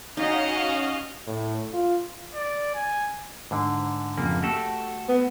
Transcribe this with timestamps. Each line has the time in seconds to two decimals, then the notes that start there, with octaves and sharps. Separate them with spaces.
0.17 C#4 D#4 F#4 D#5 F5
1.27 A2
1.74 F4
2.35 D5
2.75 G#5
3.51 G#2 D3
4.17 F2 C#3 A#3
4.42 A3 F#4 G4 A4
5.09 B3